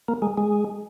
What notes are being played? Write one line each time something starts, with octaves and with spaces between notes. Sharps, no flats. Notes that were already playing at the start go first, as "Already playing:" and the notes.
A#3
G#3
G#3